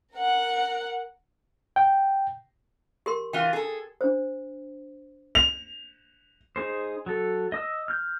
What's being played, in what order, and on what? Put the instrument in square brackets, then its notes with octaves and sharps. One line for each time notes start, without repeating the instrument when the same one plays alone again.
[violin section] A#4 F#5
[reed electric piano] G5
[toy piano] G4 A#4 C6
[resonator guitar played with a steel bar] E3 F4 [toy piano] G5
[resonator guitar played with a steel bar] G#4 A4
[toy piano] D4 C5
[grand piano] F7
[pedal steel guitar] D#4 G#4 C5
F#3 A4
D#5 D#6 E6
F6 G6